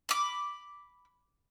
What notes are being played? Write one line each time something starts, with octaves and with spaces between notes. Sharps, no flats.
B5 D6